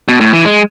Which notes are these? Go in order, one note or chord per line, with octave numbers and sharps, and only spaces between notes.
B2
A2
E3
G#3